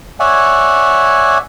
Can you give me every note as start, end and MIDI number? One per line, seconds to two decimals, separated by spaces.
0.20 1.38 73
0.20 1.38 74
0.20 1.38 76
0.20 1.38 78
0.20 1.38 80